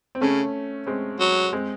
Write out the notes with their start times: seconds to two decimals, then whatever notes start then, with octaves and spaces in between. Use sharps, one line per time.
0.15 C4
0.21 C#3 A3 C#4
0.87 G#3 C4
1.20 F#3
1.53 G#3 C4